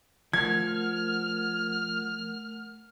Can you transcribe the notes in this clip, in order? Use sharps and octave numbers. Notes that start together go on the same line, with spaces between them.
F3 A3 A#4 F#5 F6 G#6